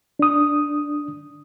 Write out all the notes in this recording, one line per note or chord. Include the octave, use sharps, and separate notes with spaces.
D4 D#6